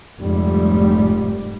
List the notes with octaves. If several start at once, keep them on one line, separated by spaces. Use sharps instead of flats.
F1 G#2 G3